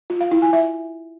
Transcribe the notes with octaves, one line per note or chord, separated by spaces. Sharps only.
F4
F5
E4
G#5
E5